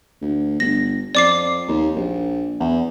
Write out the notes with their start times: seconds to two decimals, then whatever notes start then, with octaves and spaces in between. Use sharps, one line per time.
0.22 D2
0.60 G1 A#6
1.15 F2 D5 D6 C7
1.68 D#2
1.96 A#1
2.60 E2